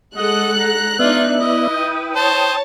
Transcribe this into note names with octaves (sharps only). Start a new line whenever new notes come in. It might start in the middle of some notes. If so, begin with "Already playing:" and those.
G#3 A4 D#5 F#5 F#6
A#5
B3 D4 D#4 F4 D5 E5
E4 B4 D#5
G5 D#6
C5 C#5 A5